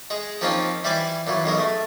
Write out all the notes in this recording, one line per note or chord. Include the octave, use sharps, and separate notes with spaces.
G#3 G#4
F3 A#3 C4 C#4 D#4 F4
E3 G3 C5 D5 G#5 D6
A#2 E3 F#3
B1 B2 G#3 A#4
A3